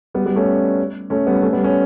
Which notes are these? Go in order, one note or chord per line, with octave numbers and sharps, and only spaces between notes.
G3 B3
G3 B3
A3 C#4
A3 C#4
G3 B3
A3 C#4
G3 B3
A3 C#4